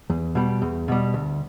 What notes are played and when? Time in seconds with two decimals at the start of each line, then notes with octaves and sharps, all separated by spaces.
0.10 E2
0.35 B2 G3
0.62 E2
0.88 B2 G3
1.14 D2